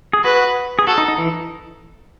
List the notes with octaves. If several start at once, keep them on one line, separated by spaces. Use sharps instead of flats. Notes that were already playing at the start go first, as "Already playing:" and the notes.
G#4
F#4 B4
G#4
F#4 A4
D#4
D#4
E3